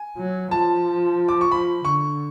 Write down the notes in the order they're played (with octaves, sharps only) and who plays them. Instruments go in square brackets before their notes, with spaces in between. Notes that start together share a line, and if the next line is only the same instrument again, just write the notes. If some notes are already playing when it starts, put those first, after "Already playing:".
Already playing: [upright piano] G#5
[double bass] F#3
[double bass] F3 [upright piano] A5
[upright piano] D6
C#6
[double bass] F3 [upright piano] B5
[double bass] D3 [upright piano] C#6